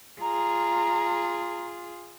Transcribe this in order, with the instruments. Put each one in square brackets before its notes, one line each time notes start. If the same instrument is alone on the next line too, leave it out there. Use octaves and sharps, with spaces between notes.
[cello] F4 G#4 [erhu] A#5